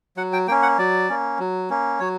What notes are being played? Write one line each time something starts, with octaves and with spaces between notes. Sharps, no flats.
F#3 F#5
G5
A#3 C#4 G5
F#5
F#3 D5
A#3 C#4
F#3
A#3 C#4
F#3 C#5